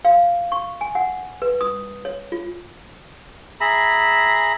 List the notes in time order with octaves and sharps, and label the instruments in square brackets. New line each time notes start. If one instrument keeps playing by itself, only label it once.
[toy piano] F5
C#6
G#5
F#5
B4
D#6
C#5
F4
[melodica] G#4 E5 A#5 B5